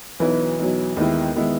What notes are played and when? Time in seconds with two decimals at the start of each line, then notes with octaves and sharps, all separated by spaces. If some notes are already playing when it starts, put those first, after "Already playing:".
0.20 B1 B2 E3 F#3
0.59 B1 B2 F#3
0.97 D#2 D#3 G#3 B3 E4
1.36 D#3 G#3 B3 E4